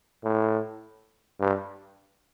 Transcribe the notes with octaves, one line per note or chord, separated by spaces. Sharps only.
A2
G2